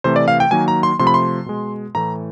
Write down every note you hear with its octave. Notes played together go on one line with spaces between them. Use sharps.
C3 E3 A3 C5
D5
F5
G5
D#3 F#3 A#3 G#5
A#5
C6
C3 F3 A3 C6
B5
C6
B2 G#3
A2 E3 A3 A#5